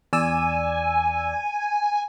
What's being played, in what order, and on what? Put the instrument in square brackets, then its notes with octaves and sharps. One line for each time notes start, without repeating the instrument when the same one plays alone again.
[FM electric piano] E2 D5 E6 [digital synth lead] G#5